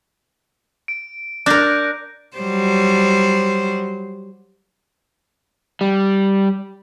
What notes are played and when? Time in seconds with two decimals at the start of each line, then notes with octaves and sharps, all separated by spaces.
0.88 D7
1.46 D4 A#4 F#6 G6 A#6
2.37 F#3 G3 C5
5.81 G3